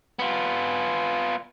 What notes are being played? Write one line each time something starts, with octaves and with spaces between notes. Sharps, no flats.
B3 F4